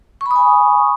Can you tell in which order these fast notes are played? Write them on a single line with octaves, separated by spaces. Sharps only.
C#6 B5 D#6 G#5